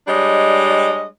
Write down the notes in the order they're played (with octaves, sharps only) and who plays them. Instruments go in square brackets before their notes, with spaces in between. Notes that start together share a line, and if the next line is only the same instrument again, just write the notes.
[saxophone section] G3 G#3 D4 C#5 D#5